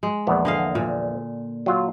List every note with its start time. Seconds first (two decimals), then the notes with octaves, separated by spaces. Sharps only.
0.03 G#3
0.27 A#1 E2 B3
0.45 D3 D#5 F5
0.75 A#2
1.66 F#3 F4